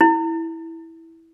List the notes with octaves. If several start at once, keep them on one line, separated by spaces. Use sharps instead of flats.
E4